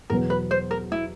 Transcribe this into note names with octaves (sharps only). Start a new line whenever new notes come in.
E2 B2 F#3 B3 A#4
B4
C5
A#4
E4